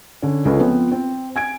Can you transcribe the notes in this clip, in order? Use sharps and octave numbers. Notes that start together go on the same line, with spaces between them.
D3 C#4
C#2 C#4 A4 B4 C#5
F3 B3 C4
C4
G#5 G#6 D7